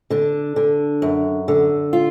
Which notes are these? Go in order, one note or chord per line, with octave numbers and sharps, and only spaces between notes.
D3 D4
D3
F#2
D3
F4